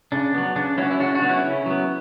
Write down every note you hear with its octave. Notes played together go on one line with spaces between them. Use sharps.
C#3 D4
F#3 B3
C#3 D4
F#3 B3 C#4 E4
E4
C#3 D4 F#4
D4 F#4
F#3 B3
C#4 E4
C#3
F#3 B3